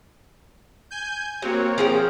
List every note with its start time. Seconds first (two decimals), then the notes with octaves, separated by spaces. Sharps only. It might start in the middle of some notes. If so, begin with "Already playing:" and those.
0.91 G#5 G6
1.42 F#3 A#3 C4 C#5
1.78 F3 G#4 G5